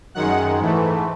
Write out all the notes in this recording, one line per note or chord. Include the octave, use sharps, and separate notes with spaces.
F#2 D#3 G#3 F#5
G#2 E3 A3